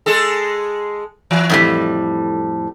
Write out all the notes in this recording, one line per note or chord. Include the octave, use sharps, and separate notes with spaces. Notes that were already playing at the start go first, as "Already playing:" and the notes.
G#3 G#4 A4
E3
F2 A2 G3